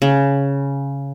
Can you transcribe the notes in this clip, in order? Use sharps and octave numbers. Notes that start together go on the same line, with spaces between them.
C#3